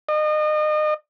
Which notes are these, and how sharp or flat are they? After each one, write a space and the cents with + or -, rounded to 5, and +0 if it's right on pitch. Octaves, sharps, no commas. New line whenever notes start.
D#5 -30